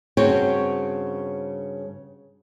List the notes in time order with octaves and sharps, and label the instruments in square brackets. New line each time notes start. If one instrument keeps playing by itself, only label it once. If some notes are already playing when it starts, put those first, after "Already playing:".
[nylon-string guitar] G2 C#3 C4 F#4 C#5 G5